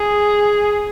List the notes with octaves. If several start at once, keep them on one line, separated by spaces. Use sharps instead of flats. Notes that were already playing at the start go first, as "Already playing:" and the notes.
Already playing: G#4